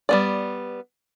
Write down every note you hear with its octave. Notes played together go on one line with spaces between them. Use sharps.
G3 B3 D5